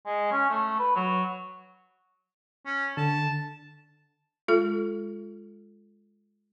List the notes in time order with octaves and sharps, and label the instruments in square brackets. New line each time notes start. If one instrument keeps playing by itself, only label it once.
[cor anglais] G#3
C#4
A3
B4
F#3
[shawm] C#4
[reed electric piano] D3 [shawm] A5
[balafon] G#3 F4 A4